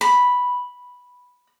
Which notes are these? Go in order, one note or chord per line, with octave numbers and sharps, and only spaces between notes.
B5